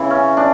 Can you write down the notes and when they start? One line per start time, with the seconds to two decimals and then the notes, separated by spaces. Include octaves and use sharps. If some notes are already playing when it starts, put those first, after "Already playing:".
Already playing: C#3 E3
0.10 C#4
0.37 D4